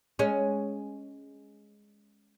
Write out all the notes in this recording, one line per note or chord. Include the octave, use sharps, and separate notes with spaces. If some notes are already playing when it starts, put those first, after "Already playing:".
G#3 C#4